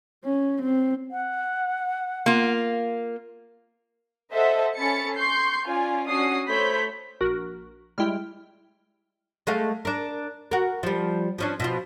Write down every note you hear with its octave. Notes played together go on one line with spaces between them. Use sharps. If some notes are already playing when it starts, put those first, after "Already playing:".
C#4
C4
F#5
A#3 F4
A4 C5 D#5 E5 F#5 A5
C#4 A4 B5 A6 C#7
C6 C#6 G6 C7
C#4 F4 D5 G#5
C#4 D4 F#4 D#6 C7
A3 C5 C#5 B5 G6 B6
A#1 F#4 A#4
G3 G#3 E4 G5 F6
G#3 A3 F5
D4 A#4
F#4 A#4
F3 G3
F3 C#4 D4
B2 F3 F4